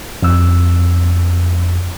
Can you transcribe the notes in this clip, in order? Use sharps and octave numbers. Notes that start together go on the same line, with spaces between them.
F2 E6